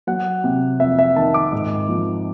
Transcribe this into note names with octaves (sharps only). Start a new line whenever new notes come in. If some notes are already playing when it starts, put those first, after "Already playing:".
F#3 F#5
C3
F2 E5
E5
D#3 A5
D6
G#2
F3